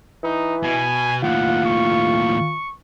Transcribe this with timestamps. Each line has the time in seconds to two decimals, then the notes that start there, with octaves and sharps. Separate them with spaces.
0.23 E3 D#4
0.63 B2 G#5
1.23 D#2 A2 F4 F#5
1.65 C#6